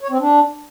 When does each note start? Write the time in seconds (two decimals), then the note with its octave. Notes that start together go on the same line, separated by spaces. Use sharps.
0.01 C#5
0.10 C4
0.19 D4